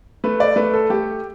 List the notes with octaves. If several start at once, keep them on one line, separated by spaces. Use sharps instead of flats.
A3 B4
D5
A3 B4
A4
A3 G4